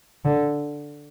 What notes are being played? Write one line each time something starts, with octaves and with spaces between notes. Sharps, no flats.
D3